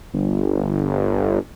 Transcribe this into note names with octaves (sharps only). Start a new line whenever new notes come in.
G1